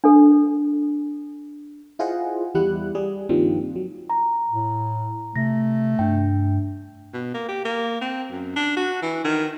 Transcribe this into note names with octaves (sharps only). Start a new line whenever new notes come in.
D4 A4
E4 F4 G#4 C5 D#5 F#5
E2 G3 E4 G4 F#5 F#6
G3 G#4
G2 D#3 F3 G3 A#3 C4
F#3
A#5
A2
C3 A3 A#6
G2 D4 G5
B2
A#3
G4
A#3
C4
F#2
D4
F#4
E3
D#3